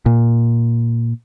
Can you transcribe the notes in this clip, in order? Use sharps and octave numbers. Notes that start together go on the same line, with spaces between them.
A#2